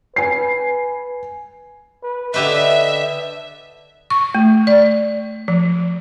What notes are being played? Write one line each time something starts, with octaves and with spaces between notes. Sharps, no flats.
B4 G#5 C7
B4
D3 G4 B4 D#5 E5
C#6
A3
D5
F3